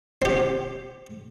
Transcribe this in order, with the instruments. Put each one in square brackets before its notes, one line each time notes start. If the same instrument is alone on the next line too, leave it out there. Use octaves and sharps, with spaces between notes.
[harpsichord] C4 G4